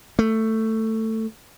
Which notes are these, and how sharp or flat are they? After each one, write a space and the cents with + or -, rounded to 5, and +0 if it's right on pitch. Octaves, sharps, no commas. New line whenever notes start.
A3 +10